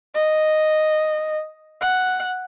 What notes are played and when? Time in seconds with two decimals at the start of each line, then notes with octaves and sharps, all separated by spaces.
0.14 D#5
1.81 F#5